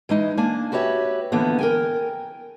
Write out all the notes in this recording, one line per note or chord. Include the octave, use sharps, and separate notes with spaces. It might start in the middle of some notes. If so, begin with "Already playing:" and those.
E3 G#3 D#4 E4
A#3 D4 G#5
F#4 G4 B4 C#5 E5
D3 E3 F3 A#3 B3
A#4 G5 G#5